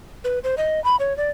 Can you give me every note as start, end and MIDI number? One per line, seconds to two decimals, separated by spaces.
0.24 0.39 71
0.44 0.55 72
0.57 0.82 75
0.84 0.96 83
1.00 1.16 73
1.17 1.31 74